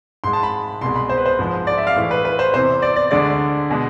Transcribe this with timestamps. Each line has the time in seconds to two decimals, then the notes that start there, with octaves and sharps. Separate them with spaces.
0.24 G#2 G#3 C6
0.33 A5
0.43 B5
0.81 C2 B2 G#3 C6
0.96 B5
1.09 C5
1.18 B4
1.26 C5
1.39 G#2 F3 G#3
1.67 D5
1.77 E5
1.87 F5
1.96 A2 E3 G#3
2.11 B4
2.25 B4
2.39 C5
2.54 E2 C3 E3 C5
2.82 D5
2.96 D5
3.11 D2 D3 G#3 D5
3.70 B2 G#3